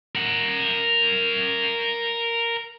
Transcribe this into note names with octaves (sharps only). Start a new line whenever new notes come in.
A#4 F#5